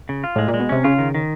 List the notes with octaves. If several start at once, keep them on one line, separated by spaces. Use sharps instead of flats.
C#3
F4
A2 G#3
A#2
G#3
B2
C3 C#4
C#3 F4
D#3
D#3